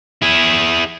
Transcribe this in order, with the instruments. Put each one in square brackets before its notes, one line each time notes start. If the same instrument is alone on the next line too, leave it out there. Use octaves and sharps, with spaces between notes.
[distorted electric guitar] E4 G#4